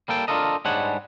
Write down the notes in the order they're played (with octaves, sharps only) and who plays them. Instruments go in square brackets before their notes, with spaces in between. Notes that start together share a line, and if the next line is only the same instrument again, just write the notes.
[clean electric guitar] G3 A#3 A4 G5
D4 D#4 F4 A4 A#4 D#5
G#2 G3 G#3 D4 C#5 F#5